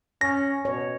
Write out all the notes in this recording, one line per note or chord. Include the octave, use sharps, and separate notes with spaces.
C#4 A#6
B2 C#5